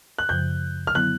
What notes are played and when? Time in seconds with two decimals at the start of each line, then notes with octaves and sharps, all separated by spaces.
0.18 F#6
0.29 F#2 C#3 F3 G6
0.87 F6
0.95 D3 F#3 B3 E4 F#6